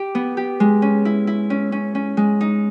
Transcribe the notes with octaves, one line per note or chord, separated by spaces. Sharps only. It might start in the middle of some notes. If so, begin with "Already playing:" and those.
Already playing: G4
B3
G4
G#3
C#4
E4
E4
C#4
C#4
C#4
G#3
D#4